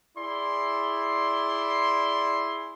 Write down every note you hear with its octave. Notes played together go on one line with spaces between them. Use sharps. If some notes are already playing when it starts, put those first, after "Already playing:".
E4 G#4 D5 C6